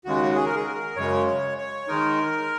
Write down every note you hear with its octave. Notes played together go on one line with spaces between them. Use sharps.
D#2 C#3 G#3 F#4
G#4
A#4
G#4
A#4
F#2 C#3 G#3 C#5
C#5
C#5
D#3 G#3 D#4 A#4